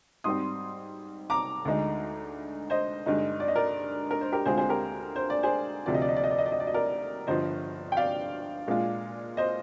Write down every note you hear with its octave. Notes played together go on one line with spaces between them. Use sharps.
G#2 G3 C4 C6 D#6
A#5 D6
D2 D3 G#3 D#4
C5 D#5
G2 D3 G#3 D#4
D5
D#5
A#4 D5
A#4
C5
G4 A#4
D2 D3 G#3 C4 F4 G#4 C5
G#4 C5
G4 A#4
C5
D5
G#4 C5
D2 C3 F3 C4 D5
D#5
D5
D#5
D5
D#5
D5
D#5
D5
D#5
D5
D#5
A#4 D5
G1 G2 F3 C5 D#5
G5
D5 F5
A#2 G#3 D4 F4
C5 D#5